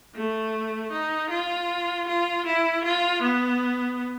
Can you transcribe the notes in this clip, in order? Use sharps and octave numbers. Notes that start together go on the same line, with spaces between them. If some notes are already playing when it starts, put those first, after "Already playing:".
A3
D#4
F4
F4
E4
F4
B3